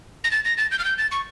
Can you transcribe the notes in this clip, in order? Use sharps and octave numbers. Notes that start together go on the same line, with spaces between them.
A#6
A6
A#6
A6
G6
F6
G6
A6
C#6